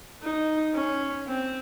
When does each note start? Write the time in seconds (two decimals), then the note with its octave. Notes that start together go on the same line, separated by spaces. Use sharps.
0.22 D#4
0.74 C#4
1.28 C4